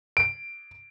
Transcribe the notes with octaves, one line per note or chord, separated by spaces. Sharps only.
D7